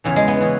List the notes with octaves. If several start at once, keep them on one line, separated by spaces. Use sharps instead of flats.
E2 C#3 E3
G#3
B3
C#3 E3